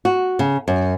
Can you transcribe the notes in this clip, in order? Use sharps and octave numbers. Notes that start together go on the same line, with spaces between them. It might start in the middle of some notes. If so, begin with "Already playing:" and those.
F#4
C#3
F#2